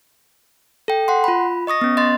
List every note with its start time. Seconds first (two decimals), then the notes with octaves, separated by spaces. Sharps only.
0.88 A4 G5
1.08 F#5 C6
1.24 F4 B5
1.67 D#5 C#6 D#6 A#6
1.81 B3 C#4
1.97 D#5 C6 A6